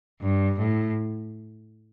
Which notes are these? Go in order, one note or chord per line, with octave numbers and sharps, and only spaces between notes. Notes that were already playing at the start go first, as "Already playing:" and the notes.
G2
A2